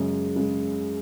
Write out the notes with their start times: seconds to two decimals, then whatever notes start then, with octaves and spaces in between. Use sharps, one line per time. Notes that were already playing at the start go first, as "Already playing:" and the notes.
Already playing: F#2 C#3 G#3
0.36 C#3 G#3